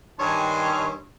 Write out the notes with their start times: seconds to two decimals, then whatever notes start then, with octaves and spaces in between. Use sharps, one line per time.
0.18 G2 D#3 D4 C#5 G#5 C6